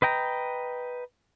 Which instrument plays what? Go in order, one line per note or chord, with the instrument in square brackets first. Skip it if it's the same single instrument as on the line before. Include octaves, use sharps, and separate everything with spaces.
[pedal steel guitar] B4 D#5 G5 A#5